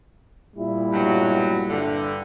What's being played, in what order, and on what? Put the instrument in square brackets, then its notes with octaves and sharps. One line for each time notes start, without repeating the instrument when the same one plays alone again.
[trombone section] A#2 G3 E4
[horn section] G2 B2 F#3
G2 D3